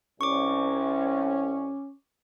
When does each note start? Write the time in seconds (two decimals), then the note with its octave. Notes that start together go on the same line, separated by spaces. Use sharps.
0.21 C2 C#4 C#6 D6